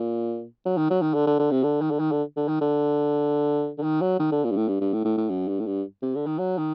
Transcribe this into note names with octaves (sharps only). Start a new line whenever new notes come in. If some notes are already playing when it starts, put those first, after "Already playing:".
Already playing: A#2
F#3
D#3
F#3
D#3
D3
D3
D3
C3
D3
D#3
D3
D#3
D3
D3
D#3
D3
D3
D#3
F#3
D#3
D3
A#2
G2
A2
G2
G2
A2
A2
A2
F#2
G2
A2
G2
C3
D3
D#3
F#3
D#3